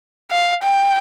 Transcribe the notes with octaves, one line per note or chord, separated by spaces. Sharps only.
F5
G5